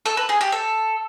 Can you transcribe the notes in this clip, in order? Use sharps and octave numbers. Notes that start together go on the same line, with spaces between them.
A4
B4
G#4
G4
A4